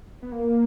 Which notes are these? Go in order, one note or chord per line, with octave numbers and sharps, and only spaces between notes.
B3
A#3